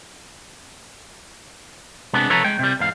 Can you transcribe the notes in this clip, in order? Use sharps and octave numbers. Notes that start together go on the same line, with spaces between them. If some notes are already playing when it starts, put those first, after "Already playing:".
C3 G#3 B3 D4
C3 F3 A4 B4 C#5 A#5
G#3 G5
C3 G3
E2 G#2 F5